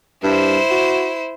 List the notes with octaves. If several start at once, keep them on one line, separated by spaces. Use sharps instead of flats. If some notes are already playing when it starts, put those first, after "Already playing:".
G2 E4 C5
F#4